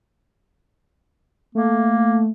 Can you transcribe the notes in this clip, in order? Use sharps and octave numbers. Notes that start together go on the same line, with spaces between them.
A3 A#3